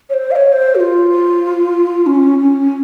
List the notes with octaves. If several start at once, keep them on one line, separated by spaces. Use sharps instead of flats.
C#5
C5
F5
C#5
C5
F#4
F4
C#4
C#4